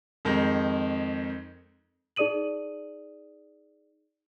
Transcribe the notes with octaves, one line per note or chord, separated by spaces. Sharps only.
F2 D#3 G#3 D#4
D#4 G#4 D5 D#6 D#7 F#7